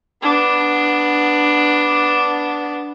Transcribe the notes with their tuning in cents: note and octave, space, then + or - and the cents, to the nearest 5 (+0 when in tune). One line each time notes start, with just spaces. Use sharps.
B3 +0 D4 +0